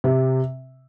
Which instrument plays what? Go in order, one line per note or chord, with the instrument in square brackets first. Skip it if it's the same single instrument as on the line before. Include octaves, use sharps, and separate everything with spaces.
[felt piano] C3